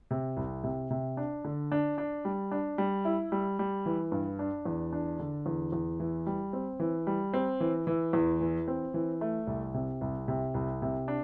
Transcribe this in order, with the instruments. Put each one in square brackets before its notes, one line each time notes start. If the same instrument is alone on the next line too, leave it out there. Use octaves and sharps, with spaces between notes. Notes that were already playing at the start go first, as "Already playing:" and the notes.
[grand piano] C3
C2
C3
C3
D4
D3
D4
D4
G3
D4
G3
E4
G3
G3
E3
G2
D4
E2
D4
D3
E2
E2
E3
G3
C4
E3
G3
C4
E3
E3
E2
E3
C4
E3
A3
C2
C3
C2
C3
C2
C3
D4